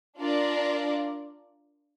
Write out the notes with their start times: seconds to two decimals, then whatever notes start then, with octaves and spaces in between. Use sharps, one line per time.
0.18 D4 F4 A#4 D5